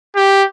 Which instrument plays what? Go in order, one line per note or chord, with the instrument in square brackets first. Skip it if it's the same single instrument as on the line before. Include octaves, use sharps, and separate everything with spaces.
[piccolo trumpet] G4